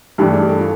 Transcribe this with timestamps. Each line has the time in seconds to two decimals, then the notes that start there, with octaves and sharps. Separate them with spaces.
0.18 G2 E3 A3 D4 G4
0.33 G#4
0.49 A4
0.61 F4